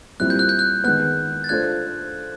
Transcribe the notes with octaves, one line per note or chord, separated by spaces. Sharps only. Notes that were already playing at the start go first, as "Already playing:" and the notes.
A#2 G3 C4 E4 F#6
G6
F#6
G6
F#6
D#3 G#3 B3 F#6
A6
A3 D4 F4 A4 C5 F#6 G#6